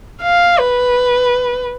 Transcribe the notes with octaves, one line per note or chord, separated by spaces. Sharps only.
F5
B4